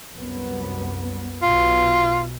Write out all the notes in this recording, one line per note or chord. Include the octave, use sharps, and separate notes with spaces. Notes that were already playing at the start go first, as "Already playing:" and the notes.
C2 F#2 B3
B1 B2 F4